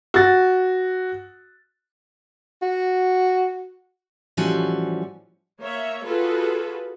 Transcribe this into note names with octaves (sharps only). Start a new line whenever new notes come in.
F#4 A6
F#4
A2 E3 F3 G3 C#4 F#4
A#3 C#5 E5
F4 F#4 G#4 A4 B4